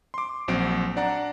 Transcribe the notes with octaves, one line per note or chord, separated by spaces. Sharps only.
C6 D6
A#1 F#3 C4 D7
D4 D5 F#5 A#5